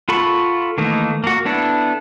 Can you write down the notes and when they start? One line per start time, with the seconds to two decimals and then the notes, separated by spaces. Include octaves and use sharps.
0.09 F4 A4 F#5 B5 C#6
0.78 D#3 E3 A3 A#3 D#4
1.24 A#3 F#4
1.45 B3 D4 E4 A4